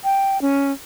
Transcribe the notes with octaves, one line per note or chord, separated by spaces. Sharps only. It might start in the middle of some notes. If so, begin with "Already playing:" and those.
G5
C#4